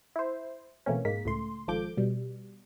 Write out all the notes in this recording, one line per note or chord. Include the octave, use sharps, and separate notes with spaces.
E4 C5
B2 E3 A3 A#3 C4 C#4
G#2 G#3 A#3 B6
C#2 A2 A3 C6
G#1 G#2 F3 A4 D6 G6
B2 G3